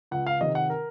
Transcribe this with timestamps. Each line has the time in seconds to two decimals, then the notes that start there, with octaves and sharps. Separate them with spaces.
0.11 C#2 F#5
0.27 F5
0.41 C3 D#3 D#5
0.55 F#5
0.70 A#4